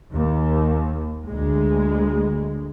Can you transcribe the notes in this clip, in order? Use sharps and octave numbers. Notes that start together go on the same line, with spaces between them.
D#2
D2 G#3